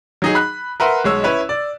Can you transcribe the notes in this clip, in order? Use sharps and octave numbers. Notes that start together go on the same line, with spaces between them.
F#3 D#4 G#4
B5 F#6
A#4 B4 E5 F#5 C6
B1 G#3 C#5 E6
C#4 E4 B4 C#5
D5